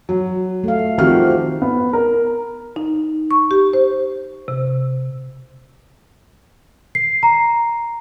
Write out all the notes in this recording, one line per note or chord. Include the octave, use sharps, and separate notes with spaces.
F#3
A3 F5
D#3 F3 C4 F#4 G4 F6
B3
A#4
D#4
C#6
G4
C5
C3
C7
A#5